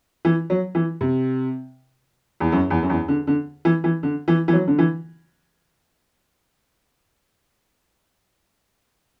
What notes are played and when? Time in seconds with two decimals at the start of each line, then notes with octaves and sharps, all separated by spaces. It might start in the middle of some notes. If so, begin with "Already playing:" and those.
0.25 E3
0.50 F#3
0.75 E3
1.01 C3
2.40 E2
2.52 F#2
2.70 E2
2.83 F#2
2.90 E2
3.08 D3
3.27 D3
3.65 E3
3.84 E3
4.03 D3
4.28 E3
4.48 E3
4.53 F#3
4.67 D3
4.79 E3